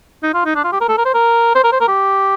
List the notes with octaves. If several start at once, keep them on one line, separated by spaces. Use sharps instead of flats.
D#4
F4
D#4
D4
F4
G4
A#4
A4
A#4
C5
A#4
C5
A#4
C5
A#4
G4